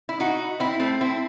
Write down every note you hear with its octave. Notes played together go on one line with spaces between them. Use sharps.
E4
D#4 F#4
C4 E4
A3 C4
C4 E4